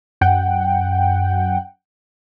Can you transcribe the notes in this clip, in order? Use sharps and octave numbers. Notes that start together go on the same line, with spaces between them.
F#2 F#5 G5